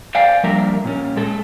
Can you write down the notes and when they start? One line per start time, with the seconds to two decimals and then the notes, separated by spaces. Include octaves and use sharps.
0.15 C5 D5 F5 G5 G#5
0.43 F3 G3 A#3 D4 A#4 E5
0.84 A#2 C#4
1.16 G#3 A4